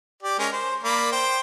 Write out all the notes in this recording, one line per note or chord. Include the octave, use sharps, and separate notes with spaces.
G4 D5
G#3 C#4 A#4
C5
A#3 D5 B5
C5 G5